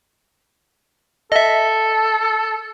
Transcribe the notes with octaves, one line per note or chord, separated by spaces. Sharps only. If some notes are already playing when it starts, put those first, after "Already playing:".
A4 D#5 E5